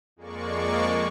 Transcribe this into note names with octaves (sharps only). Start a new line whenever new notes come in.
F2 G#3 A#3 D5 C#6